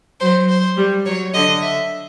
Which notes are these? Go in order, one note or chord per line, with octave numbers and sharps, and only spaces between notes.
F#3 C5
C5
G3
F#3 C#5
D3 D#5
E5